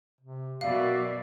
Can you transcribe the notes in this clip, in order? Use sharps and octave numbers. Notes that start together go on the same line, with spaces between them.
C3
F#2 B2 A#3 F#4 D5 E5 F5